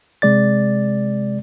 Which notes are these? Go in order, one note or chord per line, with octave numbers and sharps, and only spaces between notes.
C3 G#3 D5 A6